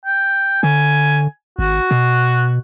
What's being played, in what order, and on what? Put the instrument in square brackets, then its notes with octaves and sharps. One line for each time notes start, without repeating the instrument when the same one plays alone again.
[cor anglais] G5
[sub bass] D3 [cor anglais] G#5
[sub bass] G#1 [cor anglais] F#4
[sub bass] B2